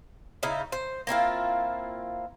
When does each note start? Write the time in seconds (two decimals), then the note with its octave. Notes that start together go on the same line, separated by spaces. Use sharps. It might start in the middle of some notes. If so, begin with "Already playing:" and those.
0.43 C#3 D#4 E4
0.72 C5
1.07 A#3 C4 E4 F4